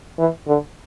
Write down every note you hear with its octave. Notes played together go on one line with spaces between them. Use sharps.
E3
D3